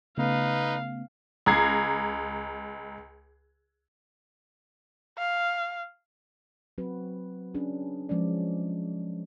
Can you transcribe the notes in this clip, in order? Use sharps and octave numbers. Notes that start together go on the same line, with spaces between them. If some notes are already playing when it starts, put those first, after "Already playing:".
C#3 A3 B3 D#4 B4 F5
C#2 A#5 G#6 C7
F5
F#3 C4 F#4 B4
C#4 D4 G#4
F3 G#3 C#4 D5